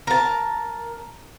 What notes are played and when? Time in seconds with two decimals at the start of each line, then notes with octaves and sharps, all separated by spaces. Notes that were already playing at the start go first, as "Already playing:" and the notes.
0.07 A#4 A5